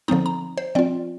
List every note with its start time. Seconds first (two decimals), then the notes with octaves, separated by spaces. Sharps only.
0.08 D3 F3 C4 D#4 A#5
0.26 A#5
0.58 C5
0.75 F3 C4 F4 D5